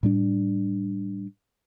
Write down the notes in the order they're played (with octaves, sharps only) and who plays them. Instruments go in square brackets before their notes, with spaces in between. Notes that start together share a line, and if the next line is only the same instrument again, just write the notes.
[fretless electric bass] A2 G3 D4